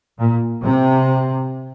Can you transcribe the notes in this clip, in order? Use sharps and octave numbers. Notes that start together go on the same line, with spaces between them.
A#2
C3